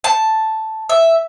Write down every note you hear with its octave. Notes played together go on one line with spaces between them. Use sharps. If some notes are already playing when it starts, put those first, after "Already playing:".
A5
E5